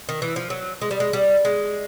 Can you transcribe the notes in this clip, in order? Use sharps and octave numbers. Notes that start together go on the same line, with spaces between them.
D#3
E3
F3
F#3
G#3
G3
G#3
G3
G#3